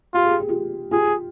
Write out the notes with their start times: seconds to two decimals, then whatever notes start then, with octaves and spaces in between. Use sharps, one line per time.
0.14 F4 G4
0.23 G#4
0.31 G4
0.40 G#4
0.49 F4 G4
0.91 F4 G4 G#4